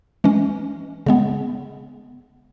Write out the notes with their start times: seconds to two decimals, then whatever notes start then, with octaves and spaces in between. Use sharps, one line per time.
0.24 E3 G#3 C#4
1.06 C#3 G#3 B3